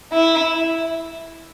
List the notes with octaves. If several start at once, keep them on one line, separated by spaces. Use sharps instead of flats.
E4